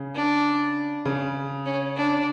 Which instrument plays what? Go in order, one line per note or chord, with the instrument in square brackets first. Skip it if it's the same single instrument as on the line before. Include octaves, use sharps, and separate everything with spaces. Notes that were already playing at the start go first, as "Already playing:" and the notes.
Already playing: [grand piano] C#3
[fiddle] D4
[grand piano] C#3
[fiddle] C#4
D4